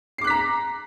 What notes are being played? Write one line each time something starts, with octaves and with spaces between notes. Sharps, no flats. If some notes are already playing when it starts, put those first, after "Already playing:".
A#5 D6 F#6 B6 C7